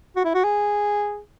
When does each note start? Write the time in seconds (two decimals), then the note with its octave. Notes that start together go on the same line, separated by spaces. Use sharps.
0.16 F#4
0.25 E4
0.34 F#4
0.44 G#4